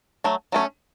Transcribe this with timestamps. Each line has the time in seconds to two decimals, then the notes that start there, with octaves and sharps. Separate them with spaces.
0.24 F#3 A3
0.52 F#3 A3 C#4